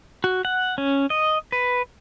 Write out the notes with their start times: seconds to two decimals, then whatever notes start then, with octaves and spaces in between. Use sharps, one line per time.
0.24 F#4
0.45 F#5
0.78 C#4
1.10 D#5
1.52 B4